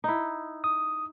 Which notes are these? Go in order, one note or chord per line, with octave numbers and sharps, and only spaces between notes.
D#4 E4
D#6